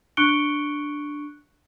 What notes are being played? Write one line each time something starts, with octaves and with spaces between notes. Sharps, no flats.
D4 C#6 F#6 C#7 D7 G7